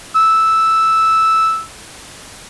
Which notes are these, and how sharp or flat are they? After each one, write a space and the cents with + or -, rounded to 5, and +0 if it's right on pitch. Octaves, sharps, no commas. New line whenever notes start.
E6 -5